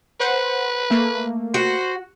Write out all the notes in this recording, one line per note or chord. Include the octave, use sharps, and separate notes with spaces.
B4 C5 F#5
A3 A#3
F#4 C5